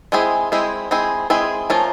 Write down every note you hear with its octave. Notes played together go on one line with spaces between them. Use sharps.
G#3 C4 E4 G#4
G#3 C4 E4 G#4
G#3 C4 E4 G#4
G#3 C4 E4 G#4
F3 A3 C#4 F4 A#4